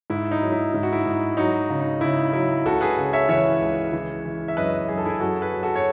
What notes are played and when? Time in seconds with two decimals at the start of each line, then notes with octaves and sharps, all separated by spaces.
0.10 G#2 E4
0.31 D#4
0.41 F#3
0.52 E4
0.74 G#2 E4
0.83 F#4
0.92 E4
1.06 G#2
1.37 F#3 D#4 F#4
1.70 C#3
1.80 D#4
2.01 C#3 E4
2.33 F#3 E4
2.65 C#2 F#4 A4
2.81 G#4 B4
2.97 C#3
3.13 C#5 E5
3.29 E3 C#5 E5
3.61 C#2
3.93 E3
4.25 E3
4.48 E5
4.57 F#2 B4 D#5
4.88 F#2 G#4
4.98 A4
5.05 E4 G#4
5.20 F#2 F#4 A4
5.42 G#4 B4
5.53 F#3
5.63 F#4 A4
5.76 C#5